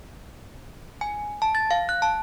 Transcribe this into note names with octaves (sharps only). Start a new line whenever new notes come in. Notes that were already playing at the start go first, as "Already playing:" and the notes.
G#5
A5
A6
F5
F#6
A5